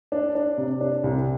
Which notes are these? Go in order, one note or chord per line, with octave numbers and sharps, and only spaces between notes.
D4
D4
C3
D4
C2